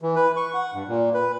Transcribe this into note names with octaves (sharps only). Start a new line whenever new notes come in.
E3
B4
C#6
F#5
G2
A#2
B4